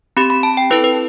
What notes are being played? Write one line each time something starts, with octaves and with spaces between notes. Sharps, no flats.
C4 G4 B5
B5
A5
G5
C4 E4 A4 B4
B4